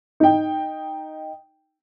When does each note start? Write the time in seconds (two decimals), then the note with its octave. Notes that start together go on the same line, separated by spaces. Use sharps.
0.20 D#4 G5